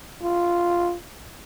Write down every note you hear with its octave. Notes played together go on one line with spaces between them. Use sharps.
F4